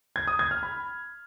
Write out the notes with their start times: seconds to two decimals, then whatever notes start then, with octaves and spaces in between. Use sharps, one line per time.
0.16 G#6
0.27 D#6
0.39 G#6
0.51 F6
0.63 B5